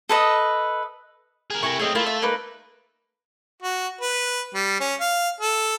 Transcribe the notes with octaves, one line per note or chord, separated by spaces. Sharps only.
A4 B4 D#5
G#4 A#4
C3 E4 A#4 G#5 C#6
A3 C4 G#4 C#5 D#5
A3 E4 F4 A#4
F4 E5
A#3 D#4 B4
F#4
B4
G3
C#4
F5
A4